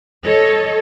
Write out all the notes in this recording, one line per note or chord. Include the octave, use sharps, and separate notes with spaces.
A4 C#5 D#5